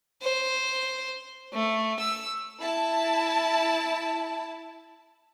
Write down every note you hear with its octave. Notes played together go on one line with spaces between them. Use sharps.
C5
A3
E6
E4 A5